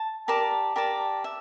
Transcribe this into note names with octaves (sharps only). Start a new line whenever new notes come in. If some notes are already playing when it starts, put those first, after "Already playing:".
Already playing: A5
G4 A#4 D5 A5
G4 A#4 D5 A5
E5